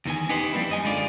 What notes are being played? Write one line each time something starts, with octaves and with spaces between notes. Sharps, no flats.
E2 D#3 B3 G#5
C#4 D#4 G4 B4 C5
F3 G3 A#3 C4 E4
F#2 D#5 G#5
D3 G#3 F4 D5